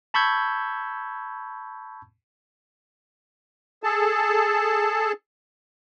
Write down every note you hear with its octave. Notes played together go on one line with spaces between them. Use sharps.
A5 B5 C#6 E6 G6 G#6
G#4 A4 A5